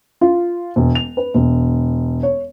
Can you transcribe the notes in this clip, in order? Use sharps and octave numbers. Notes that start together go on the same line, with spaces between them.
F4
E1
F7
B4
E1
C#5